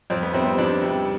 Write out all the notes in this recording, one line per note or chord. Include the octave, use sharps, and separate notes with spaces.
F2 C4
B3
C3 G3 C4
C4
F2 D4
C3 G3